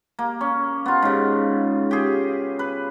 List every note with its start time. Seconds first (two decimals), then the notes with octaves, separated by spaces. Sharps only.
0.19 A#3
0.41 C#4
0.86 B3 F4
1.02 G#2 C#3
1.91 G4 G#4
2.59 B4